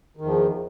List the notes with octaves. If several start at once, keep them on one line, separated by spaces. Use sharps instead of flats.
E2 D#3 F3